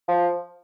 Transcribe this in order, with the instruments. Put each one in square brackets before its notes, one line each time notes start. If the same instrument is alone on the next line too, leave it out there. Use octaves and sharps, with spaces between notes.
[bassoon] F3